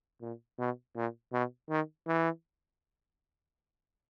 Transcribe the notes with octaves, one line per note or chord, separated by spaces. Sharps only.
A#2
B2
A#2
B2
D#3
E3